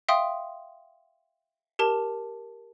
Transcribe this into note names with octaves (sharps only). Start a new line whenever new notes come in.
E5 F5 G5 C6 D#6
G4 A#4 A5